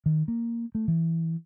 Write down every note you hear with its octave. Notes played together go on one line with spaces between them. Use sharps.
D#3
A#3
A3
E3